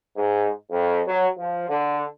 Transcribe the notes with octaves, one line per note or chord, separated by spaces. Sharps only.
G#2
F2
F#3
F3
D3